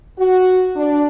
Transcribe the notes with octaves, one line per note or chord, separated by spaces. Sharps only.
F#4
D4